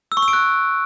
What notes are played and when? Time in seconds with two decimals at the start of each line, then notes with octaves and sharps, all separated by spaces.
0.12 E6
0.17 C#6
0.22 E6
0.28 D7
0.33 F#6